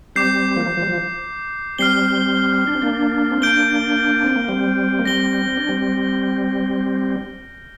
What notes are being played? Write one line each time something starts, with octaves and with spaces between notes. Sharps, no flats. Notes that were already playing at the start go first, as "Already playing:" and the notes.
G3 C4 D6 G6 C7
F3 A#3
F3
F3
G3
F3
G3 C4 F6 C7 G7
D4
C4
A#3 D4
C4
A#3 D4 G6 D7 G7
C4
A#3
G3 C4
A#3
G3 C4 A#6 G7
C4
D4
G3 C4